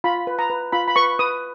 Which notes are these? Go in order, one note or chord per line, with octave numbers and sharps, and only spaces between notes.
F4 B5
B4
A#5
B4
F4 B5
B5
B4 C#6
B4 D#6